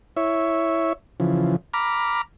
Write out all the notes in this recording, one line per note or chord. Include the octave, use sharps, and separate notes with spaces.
E4 C#5 E5
C#3 E3 F3
A#5 B5 D6 F6